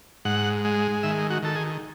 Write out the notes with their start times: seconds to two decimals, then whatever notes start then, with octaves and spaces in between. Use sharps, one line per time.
0.25 G#2 F#5
0.65 G#3
1.03 D#3 E5
1.30 F#4
1.43 D#3 A4
1.55 G#4